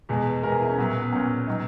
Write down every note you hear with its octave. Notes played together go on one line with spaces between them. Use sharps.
E2 B2 G#3
E2 B2 G#3 A#4
G#4
E4
C#4
A#2 F#3 B3
B3
B3
A#2 F#3 C#4
B2 F#3 D#4